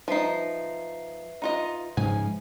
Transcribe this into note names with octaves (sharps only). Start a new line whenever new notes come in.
F3 D#4 B4 E5 C7
D#4 F4 D#5
G#2 C#3 F3 G#5